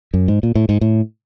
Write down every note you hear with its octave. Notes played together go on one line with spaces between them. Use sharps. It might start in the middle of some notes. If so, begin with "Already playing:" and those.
F#2
G#2
A#2
A2
G#2
A2